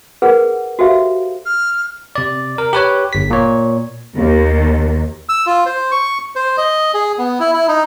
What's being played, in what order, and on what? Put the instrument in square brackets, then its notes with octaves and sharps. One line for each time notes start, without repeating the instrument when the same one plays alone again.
[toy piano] G#4 A#4 B4 F#5
F#4 G4 A4 C5 E5 F5
[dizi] F6
[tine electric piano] C3 D5
A#4
G4 B4 C#5
G1 B6
A#2 C#5
[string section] D#2
[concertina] E6
F4
C5
C#6
C5
D#5
G#4
B3
E4
E4
D#4